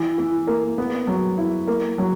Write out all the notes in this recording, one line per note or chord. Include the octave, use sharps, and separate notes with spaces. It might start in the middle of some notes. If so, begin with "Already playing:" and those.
Already playing: E3
E3
A#3
B3
F#3
E4
A#3
F#3